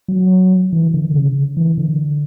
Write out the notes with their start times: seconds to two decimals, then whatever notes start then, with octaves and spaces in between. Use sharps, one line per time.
0.08 F#3
0.73 E3
0.94 D3
1.14 C#3
1.57 E3
1.78 D3